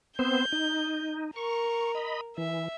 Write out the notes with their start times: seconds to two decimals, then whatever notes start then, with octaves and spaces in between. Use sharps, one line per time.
0.19 B3 C4 C5 G6
0.52 D#4
1.36 A#4 C#6
1.95 D#5 B5
2.38 E3 E5